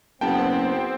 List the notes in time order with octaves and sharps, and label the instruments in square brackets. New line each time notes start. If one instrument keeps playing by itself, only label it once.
[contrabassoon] F#1 [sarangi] B3 [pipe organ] C4 [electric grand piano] G5 A5